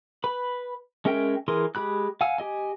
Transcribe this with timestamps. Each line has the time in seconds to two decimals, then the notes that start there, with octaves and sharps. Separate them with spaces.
0.24 B4 B5
1.05 G#3 C#4 A#4 E5 G5
1.48 E3 G#4 A#4 C6
1.75 G#3 G4 B5 F#6
2.21 F5 F#5 G#5 E6
2.38 G4 D#5 G#5